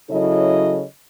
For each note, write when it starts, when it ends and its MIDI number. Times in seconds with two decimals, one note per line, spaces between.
0.10 0.83 49
0.10 0.83 54
0.10 0.83 64
0.10 0.83 69
0.10 0.83 73
0.10 0.83 75